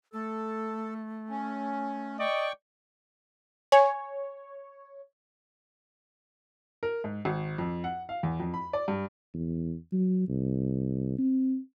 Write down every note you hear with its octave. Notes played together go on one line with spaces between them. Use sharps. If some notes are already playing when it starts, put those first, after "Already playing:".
A3 A4
C#4
D5 D#5 G5 C#6
C#5 G#5
A#4
G#2
G#1
F2
F#5
F5
E2
F2
B5
D5
G2
E2
F#3
C2
C4